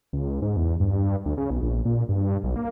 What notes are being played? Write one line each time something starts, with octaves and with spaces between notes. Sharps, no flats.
C#2
G#2
E2
G2
D2
C#3
B1
A#1
A#2
G2
B1
A#3